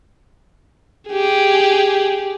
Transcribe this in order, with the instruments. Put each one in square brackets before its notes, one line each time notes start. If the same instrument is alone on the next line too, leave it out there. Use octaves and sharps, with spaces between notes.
[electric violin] G4 G#4